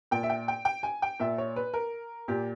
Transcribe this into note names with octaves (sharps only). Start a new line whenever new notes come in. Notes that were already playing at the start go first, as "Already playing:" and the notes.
A#2 G5
E5
G5
G5
G5
G#5
G5
A#2 E5
C#5
B4
A#4
A#2 G4